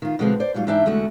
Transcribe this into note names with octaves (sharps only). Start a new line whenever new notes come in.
D#3 F4
B2 D3 F3 G#3 B3 C4
C5 D5
G#2 F#3 G3 F4
G#2 E3 D4 E5 G5
E2 D3 G#3 A3 F#4